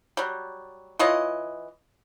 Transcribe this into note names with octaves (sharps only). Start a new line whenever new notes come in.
F#3 G3
E3 F4 C#5 D#5